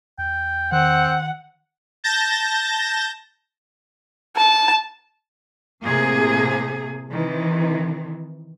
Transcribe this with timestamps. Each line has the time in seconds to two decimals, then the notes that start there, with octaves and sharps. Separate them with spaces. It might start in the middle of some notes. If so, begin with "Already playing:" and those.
0.18 E2 G5
0.72 D#3 C4 F#5 F#6
2.04 A5 G6 A6 A#6
4.36 A5
5.83 A2 C3 A#3 G#4
7.11 C3 D#3 E3